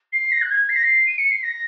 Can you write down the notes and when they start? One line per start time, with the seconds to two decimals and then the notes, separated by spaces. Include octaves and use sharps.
0.12 C7
0.31 A#6
0.41 F#6
0.50 G#6
0.69 C7
0.75 A#6
0.83 C7
1.06 D#7
1.18 C#7
1.30 C7
1.43 A#6